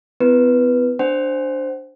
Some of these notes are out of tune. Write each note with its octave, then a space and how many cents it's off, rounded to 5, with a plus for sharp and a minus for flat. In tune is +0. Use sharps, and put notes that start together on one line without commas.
B3 +40 E4 +15 B4 -10
D4 +0 C5 +0 F#5 +35